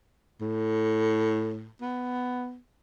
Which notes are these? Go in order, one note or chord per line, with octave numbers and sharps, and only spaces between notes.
A2
B3